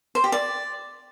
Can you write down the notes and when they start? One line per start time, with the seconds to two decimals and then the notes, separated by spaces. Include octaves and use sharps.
0.15 C5
0.24 G4
0.32 D5